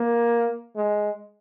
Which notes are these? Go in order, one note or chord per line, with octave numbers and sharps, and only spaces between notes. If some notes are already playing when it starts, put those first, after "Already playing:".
Already playing: A#3
G#3